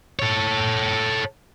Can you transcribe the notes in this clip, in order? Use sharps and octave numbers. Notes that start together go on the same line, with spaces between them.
A4 C#5